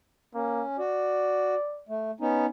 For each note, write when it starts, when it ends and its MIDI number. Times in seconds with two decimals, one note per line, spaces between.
0.35 0.63 58
0.35 0.77 61
0.79 1.55 66
0.79 1.84 74
1.89 2.11 57
2.20 2.46 59
2.20 2.46 61
2.20 2.46 63